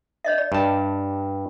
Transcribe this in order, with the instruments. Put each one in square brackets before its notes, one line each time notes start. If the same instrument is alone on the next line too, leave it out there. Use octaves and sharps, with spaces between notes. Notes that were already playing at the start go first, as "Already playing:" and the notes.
[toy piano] C#5 D#5 E5
D5
[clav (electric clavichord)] G2 A5